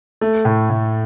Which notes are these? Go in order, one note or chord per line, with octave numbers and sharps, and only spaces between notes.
A3
A2
A2